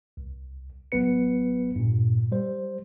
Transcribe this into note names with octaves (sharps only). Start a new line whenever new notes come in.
C2
A1 F#3 B3 B4 C#7
G2 A#2
G3 C5